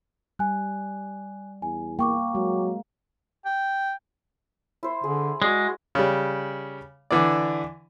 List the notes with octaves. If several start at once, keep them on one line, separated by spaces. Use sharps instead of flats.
G3 G#5 F#6
E2 G#5
A#3 G5 C#6 D6
F#3 G#3
G5
E4 C5
D3 G#4
G#3 F#4 D5
C#3 G3
D3 E3 D4 D5